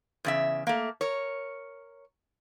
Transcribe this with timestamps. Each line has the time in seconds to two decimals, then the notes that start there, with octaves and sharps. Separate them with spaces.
0.25 E2 C#3 E5
0.67 A3 A#3
1.01 A#4 C#5